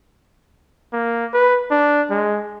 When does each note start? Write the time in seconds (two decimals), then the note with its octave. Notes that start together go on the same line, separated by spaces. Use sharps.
0.93 A#3
1.33 B4
1.71 D4
2.10 G#3